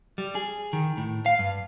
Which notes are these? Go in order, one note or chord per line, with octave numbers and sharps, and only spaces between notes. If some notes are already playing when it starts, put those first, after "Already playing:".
G3
G#4
D#3
A2
F5
G2